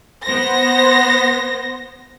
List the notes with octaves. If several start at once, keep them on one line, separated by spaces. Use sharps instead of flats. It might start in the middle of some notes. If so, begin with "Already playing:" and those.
B3 C5 A#6